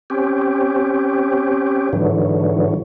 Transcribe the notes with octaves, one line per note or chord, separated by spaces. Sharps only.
C4 C#4 G4
G#2 D3 E3 F#3